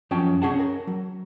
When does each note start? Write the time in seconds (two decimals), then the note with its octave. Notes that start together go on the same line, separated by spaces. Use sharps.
0.11 F#2 F3 C#4 G5 A5
0.42 C2 C#4 G#4 F#5 A5
0.59 A#4
0.87 F#3